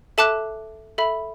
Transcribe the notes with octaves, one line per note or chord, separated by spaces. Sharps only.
A4 E5 A5 D6 F#6
A4 E5 B5